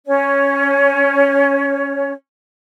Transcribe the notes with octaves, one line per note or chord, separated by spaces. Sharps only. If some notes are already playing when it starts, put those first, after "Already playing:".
C#4 C#5